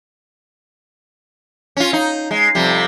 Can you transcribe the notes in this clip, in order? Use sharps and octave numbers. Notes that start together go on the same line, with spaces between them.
C#4 F4
D#4
G#3
F2 C3 G3